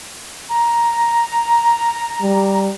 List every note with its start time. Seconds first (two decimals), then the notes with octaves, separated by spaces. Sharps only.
0.50 A#5
2.22 G3